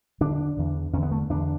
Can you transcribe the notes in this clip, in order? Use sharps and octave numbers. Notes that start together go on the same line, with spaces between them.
E2 D3 D4
E2 D3
E2 D3 C#4
B3
A3
E2 D3 D4